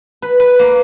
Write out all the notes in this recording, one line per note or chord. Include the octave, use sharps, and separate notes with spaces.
B4
B4
A#3